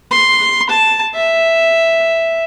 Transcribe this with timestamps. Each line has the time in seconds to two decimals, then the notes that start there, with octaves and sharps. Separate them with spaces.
0.11 C6
0.69 A5
1.14 E5